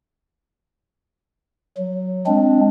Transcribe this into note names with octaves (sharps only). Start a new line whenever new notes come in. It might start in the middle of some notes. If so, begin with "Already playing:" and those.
F#3
G#3 C4 D4